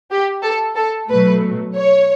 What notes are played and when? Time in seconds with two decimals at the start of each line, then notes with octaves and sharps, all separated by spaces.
0.11 G4
0.43 A4
0.76 A4
1.09 B2 F#3 A3 B4
1.74 C#5